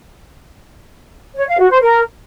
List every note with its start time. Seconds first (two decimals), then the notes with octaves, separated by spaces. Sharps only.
1.36 C#5
1.47 F5
1.59 F#4
1.70 C5
1.82 A#4